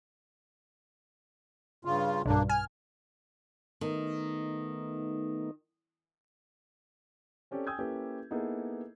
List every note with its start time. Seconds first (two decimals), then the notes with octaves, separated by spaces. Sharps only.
1.85 G2 C#3 F4
2.26 B1 G2 A#3 D4
2.50 G#5 F6
3.81 D#3 A3 B3 D#4
7.51 C4 C#4 G4 A4 C#5 D5
7.67 G5 G#5 D#6 E6 G6 G#6
7.78 A#3 C#4 E4 G4 A4 B4
8.31 A#3 B3 D#4 E4 G#4 A4